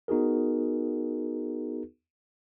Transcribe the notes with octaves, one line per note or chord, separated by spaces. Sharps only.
B3 D#4 F#4 G#4 A#4